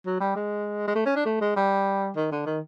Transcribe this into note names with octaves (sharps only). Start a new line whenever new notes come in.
F#3
G3
G#3
G#3
A3
C#4
D4
A3
G#3
G3
D#3
D3
D#3